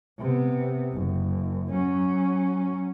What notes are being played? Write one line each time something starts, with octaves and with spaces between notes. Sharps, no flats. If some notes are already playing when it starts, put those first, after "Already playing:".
C3 B3
F#1
F#3 C#4